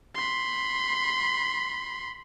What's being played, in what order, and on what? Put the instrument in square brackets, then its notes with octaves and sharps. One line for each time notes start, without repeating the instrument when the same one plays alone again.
[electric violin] B5 C6